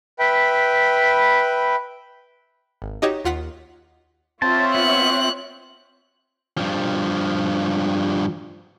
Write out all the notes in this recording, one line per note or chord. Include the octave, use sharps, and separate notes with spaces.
B4 E5 G5 B5
G#1
D#4 F#4 G4 C#5 D#5
D#2 F4 F#5 B6
C4 F4 C#5 E5 A5
B3 F#6
G2 F3